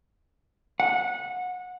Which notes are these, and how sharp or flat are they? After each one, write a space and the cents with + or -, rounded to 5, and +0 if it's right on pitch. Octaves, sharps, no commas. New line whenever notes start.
F#5 -25